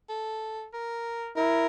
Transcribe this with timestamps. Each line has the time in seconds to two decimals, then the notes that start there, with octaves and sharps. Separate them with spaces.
0.09 A4
0.73 A#4
1.36 E4 A#4